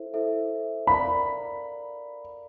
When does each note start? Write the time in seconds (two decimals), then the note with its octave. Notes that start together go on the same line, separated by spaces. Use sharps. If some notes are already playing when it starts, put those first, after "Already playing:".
Already playing: E4 A4 C5 E5
0.14 E4 A4 C5 E5
0.87 A#4 D5 F5 A#5 B5